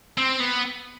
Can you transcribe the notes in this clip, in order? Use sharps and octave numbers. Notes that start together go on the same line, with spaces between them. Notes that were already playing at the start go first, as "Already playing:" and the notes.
C4
B3